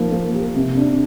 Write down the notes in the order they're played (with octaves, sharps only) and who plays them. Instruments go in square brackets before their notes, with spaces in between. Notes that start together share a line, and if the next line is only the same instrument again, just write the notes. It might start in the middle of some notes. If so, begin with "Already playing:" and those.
Already playing: [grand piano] F3 A#3 D#4
A#3
G4
C3
D4